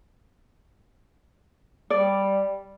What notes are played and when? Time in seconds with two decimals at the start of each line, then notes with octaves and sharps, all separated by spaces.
1.90 G3 D5